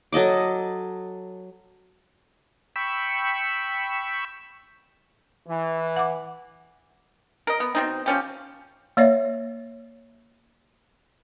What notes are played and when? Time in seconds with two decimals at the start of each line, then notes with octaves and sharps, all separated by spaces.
0.13 F#3 A4 D#5 D6
2.76 G5 B5 C#6 E6
5.47 E3
5.96 F#5 D6
7.47 A#4 D#5
7.60 B3
7.75 B2 C4 D#4
8.06 F3 C#4 G4
8.97 A#3 C#5 D5 E5